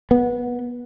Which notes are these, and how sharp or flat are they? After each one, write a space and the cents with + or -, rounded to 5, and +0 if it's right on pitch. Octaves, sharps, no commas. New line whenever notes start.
B3 -20